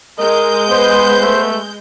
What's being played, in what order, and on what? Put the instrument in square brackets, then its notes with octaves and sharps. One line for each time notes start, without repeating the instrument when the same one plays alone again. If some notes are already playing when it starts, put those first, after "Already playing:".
[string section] G#3 G6 [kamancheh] A#4 [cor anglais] D#5
[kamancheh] B3 B4 [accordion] C5
[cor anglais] A3